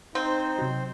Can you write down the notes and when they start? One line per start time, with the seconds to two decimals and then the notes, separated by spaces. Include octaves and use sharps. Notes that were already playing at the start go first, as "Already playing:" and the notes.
0.15 C4 D#4 C5
0.58 C3 F#3